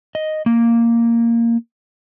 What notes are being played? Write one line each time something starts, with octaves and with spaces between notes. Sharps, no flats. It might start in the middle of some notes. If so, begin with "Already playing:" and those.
D#5
A#3